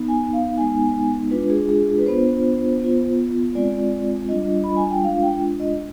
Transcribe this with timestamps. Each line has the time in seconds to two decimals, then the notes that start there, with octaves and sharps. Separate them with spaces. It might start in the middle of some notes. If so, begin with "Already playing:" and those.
Already playing: B3 D#4
0.08 G#5
0.33 F5
0.57 G#3 B3 D#4 G#5
1.31 G#3 D4 F4 B4
1.50 G#4
1.69 G#4
1.90 G#4
1.98 B4
2.05 B3 D4 F4 C5
2.80 B3 F4
3.55 G#3 C4 F4 D5
4.29 G3 D4 F4 D#5
4.64 B5
4.76 G#5
4.90 G5
5.03 G#3 D4 F4 F5
5.22 G5
5.60 D#5